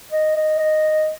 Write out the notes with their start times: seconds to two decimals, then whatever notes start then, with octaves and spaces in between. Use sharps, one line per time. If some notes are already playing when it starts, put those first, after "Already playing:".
0.12 D#5
0.36 D#5
0.59 D#5